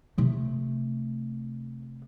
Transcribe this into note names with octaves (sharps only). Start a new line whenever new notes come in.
C3 A3